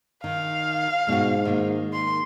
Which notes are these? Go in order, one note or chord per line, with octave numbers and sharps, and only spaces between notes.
D#3 F5
G#2 B2 F#4
D#3 A#3
C6